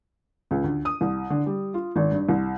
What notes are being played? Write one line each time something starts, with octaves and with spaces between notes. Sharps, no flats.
C#2
D2
D#6
C2
D3
G3
F4
G#1
G2
C2